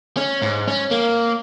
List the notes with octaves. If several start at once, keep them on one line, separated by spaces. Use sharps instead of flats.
C#4
G#2
C#4
A#3